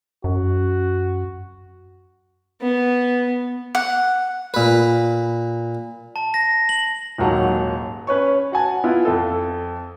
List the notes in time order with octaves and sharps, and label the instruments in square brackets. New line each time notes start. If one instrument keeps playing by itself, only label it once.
[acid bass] F#2 [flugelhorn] F#4
[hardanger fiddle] B3
[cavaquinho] F#5
[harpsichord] A#2 B4
[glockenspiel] A5
A#6
F#7
[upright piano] D#1 D#2 G#2 F#3 F#5
C#4 B4 C#5 C#6
F#4 F#5 G#5 A5
B3 E4 F4
F2 A4